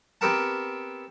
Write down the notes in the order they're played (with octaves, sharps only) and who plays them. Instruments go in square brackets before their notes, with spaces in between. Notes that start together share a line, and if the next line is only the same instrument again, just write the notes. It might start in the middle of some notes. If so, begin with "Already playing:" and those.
[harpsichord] B3 C4 G4 A#4 F#5 A5